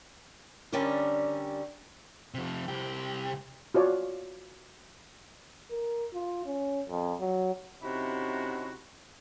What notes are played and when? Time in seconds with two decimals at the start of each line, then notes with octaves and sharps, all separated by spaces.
0.72 D3 G3 C#4 D4 G4 A#4
2.34 C3 F3
2.68 C2 G4
3.74 F4 F#4 C#5 D5
5.71 A#4
6.14 F4
6.46 C#4
6.88 F2
7.20 F#3
7.82 C3 C#4 D#4 E4 F#4